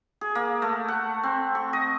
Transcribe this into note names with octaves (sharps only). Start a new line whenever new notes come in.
G#4
A#3
A3
F#5
C4
C#6
D#5